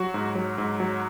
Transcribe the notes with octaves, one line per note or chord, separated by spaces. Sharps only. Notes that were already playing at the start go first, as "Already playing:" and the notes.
Already playing: F#3 F#4
G#2
F#3
G#2
F#3